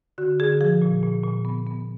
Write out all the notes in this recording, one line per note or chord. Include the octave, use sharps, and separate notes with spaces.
D3 F#4
D3 G#4
F3 G#4
A#2
A#2
A#2
B3
B3